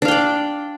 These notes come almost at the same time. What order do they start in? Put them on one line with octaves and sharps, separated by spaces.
D4 F5 G5 D5